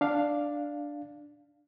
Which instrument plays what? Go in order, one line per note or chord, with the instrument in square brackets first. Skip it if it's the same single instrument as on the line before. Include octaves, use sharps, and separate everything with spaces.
[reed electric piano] D4 F5